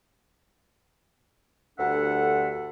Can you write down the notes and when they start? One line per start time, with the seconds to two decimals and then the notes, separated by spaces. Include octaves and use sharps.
1.79 D2 G2 D4 A4 E5 F#5